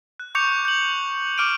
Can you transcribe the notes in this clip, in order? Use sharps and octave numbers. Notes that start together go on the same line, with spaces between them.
F#6
C#6 D6 G6 C#7 F7
G6 F#7
D6 F6 D7 D#7